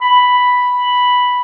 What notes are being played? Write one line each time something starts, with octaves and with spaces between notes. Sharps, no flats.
B5